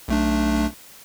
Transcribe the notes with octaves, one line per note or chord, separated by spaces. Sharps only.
B1 A3 D4